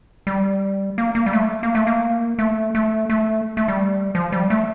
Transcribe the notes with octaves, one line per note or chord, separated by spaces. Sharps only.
G3
A#3
A#3
G3
A3
A#3
A3
A#3
A3
A3
A3
A3
G3
F3
G3
A3